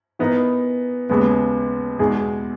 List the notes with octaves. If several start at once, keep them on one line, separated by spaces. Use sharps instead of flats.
E3 B3 D#4 A#4
D#2 C#3 G#3 B3
E2 B2 G#3 D#4 G#4